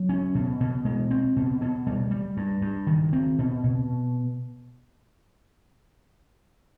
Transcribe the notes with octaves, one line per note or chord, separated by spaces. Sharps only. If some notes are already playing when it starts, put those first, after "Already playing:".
Already playing: F#3
C#4
B2
B2
G#3
C4
B2
B2
G3
G3
G2
G2
D#3
C4
B2
B2